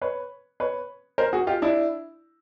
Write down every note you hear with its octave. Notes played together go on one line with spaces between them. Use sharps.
B4 C#5
B4 C#5
A#4 C5
F#4 G#4
F4 G4
D4 E4